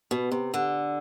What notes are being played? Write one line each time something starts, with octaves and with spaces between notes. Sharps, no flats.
B2
C3
D3